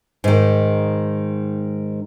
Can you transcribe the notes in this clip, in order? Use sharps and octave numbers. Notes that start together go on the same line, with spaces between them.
G#2 D#3